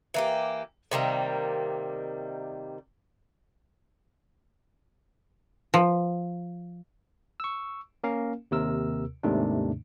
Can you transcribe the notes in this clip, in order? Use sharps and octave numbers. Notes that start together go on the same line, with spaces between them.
E3 A#3 G4
C3 D#3 G3 A#3
F3
C#6 E6
A#3 C#4 A#4 F5
D#2 C3 A#4 E6
D#2 G#2 C3 D#3 A3 D4